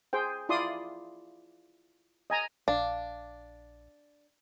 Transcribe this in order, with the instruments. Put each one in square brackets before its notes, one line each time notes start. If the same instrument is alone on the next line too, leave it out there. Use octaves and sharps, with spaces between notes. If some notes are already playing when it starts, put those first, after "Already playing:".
[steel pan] G#4 C5 G5
E4 F4 D5 C6 D#6
D#5 G#5 A#5
[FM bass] A#1 [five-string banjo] D4 [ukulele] F5